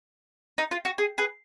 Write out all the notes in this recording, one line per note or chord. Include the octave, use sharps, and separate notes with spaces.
D#4
F4
F#4
G#4
G#4 B4